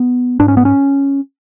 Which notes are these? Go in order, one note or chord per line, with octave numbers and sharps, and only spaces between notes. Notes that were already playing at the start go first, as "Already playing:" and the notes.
Already playing: B3
G#2 D4
C#4
B3
C#4